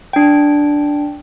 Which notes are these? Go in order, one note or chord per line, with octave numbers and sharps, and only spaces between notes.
D4 G5